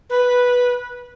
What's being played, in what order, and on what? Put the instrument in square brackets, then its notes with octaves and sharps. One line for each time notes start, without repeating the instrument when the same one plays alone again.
[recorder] B4